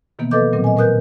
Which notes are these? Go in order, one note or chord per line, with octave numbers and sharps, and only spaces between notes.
B2 D#3 E3 A#3 B3
F3 A4 B4 D#5 D6 G6
A#2 D#3 F#3 C4
D#5 G#5
A2 A#4 B4 D#6 F#6 G6